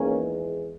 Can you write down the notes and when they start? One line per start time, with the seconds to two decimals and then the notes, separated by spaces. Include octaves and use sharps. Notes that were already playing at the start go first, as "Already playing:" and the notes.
Already playing: E2 D#3 G#3 A#3 C#4